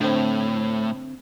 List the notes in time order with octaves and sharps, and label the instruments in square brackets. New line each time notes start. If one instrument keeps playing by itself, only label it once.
[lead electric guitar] A2 [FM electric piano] D3 C4